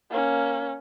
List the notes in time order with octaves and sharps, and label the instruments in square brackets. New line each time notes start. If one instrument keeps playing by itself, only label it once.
[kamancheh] A#3 C#4